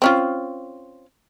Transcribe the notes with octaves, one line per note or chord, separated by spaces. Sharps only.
C4 C#4 F4